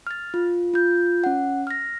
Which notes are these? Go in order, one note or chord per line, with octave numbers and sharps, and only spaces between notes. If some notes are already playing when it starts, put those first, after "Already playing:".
F6 A6
F4
F4 G6
C#4 F#5
F6 A#6